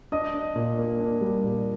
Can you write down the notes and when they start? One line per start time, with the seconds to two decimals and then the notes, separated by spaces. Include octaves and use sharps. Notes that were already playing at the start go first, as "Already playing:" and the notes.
0.12 D4 D#5 D#6
0.34 D4
0.56 A#2
0.78 A#3
1.00 D4
1.21 G3
1.44 A#2